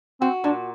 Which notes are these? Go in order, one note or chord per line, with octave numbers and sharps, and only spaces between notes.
C4 F#4
A#2 D4